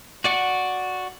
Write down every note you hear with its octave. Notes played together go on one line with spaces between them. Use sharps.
F#4 D5 F#5 C#6